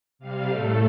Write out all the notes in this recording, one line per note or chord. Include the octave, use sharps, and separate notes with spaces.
C3 G3 F5
A2 A3 A4